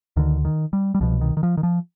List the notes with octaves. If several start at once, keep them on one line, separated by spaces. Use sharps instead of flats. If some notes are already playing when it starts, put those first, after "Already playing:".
D2 D3 D#3
D#3
G3
G3
C2 B2 F3
D#3
D#3
F3
D#3
F3